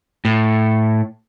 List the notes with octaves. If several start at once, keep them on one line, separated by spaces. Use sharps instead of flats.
A2